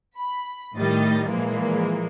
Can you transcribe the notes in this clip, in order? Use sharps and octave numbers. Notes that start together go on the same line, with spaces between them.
B5
A2 D#3 G3 D#5 A6
A#2 E3 F3 G#3 A#3